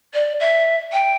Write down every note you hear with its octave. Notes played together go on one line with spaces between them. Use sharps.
D5
E5
G5